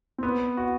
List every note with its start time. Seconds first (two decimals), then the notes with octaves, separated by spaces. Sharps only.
0.18 C4
0.23 B3
0.57 F#4